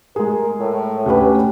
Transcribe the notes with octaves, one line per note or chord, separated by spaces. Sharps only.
G#3 G#4 A#4
A2
D2 C#4 G4 B4